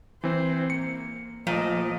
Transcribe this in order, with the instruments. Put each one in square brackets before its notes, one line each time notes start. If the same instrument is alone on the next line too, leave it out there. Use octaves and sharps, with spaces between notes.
[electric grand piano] E3 C4 [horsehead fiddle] C5
[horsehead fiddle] A#3 [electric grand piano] C#7
[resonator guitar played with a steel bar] A#2 [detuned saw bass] F3 [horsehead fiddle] A3 D#5